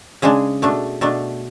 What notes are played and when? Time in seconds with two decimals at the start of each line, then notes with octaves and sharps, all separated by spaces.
0.22 C#3 G#3 D4 G#4
0.62 B2 A3 D4
1.01 B2 A3 D4